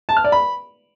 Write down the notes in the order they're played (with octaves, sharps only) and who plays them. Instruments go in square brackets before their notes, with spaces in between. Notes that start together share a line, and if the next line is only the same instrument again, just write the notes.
[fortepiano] A5
F6
D5
B5